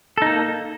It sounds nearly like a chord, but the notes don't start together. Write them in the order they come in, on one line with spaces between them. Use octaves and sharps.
A4 D#4 A#3